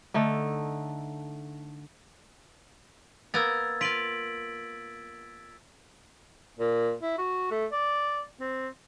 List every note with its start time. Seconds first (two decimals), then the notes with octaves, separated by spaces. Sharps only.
0.14 D3 A3 D#4
3.34 A#3 B3 A#4 E6 G#6 A6
3.81 F4 F5 B6 D7 F#7
6.59 A#2
7.02 E4
7.18 F#4
7.51 A3
7.72 D5
8.40 C4